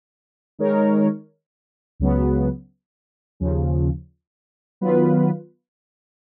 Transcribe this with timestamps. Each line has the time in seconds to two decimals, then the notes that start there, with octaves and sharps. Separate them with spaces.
0.59 D#3 G#3 D#4 A#4 C#5
2.00 C#2 C#3 F#3 B3
3.40 D#2 C#3 F3
4.81 D#3 F#3 B3 F4 B4